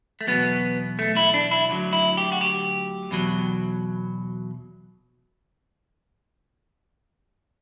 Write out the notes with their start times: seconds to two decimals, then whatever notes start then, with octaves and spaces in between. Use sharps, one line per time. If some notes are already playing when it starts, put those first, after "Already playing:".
0.21 A3
0.27 E2 B2 F#3 B3
0.99 A3
1.17 E4
1.34 D4
1.51 E4
1.70 D2 D3 F#3
1.93 E4
2.17 G4
2.32 F#4
2.41 G4
3.11 E2 B2 F#3